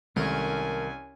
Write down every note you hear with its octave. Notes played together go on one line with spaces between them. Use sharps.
C2 D#3 G#3 A3 C#4 A#4 G#5